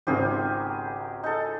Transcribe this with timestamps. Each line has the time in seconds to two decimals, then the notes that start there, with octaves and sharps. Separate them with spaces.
0.07 G#1 C#2 C4 G4 G#4 A#4
1.23 D#4 G#4 A4